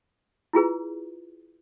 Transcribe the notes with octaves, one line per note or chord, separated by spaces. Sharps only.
E4 F4 G#4 B4